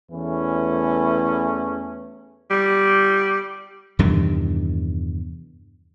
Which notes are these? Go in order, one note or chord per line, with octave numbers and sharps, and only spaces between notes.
E2 E3 A3 C#4
G3
E2 G2 C3 D#3